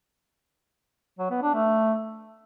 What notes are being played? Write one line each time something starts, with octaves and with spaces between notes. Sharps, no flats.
F#3
B3
D4
A3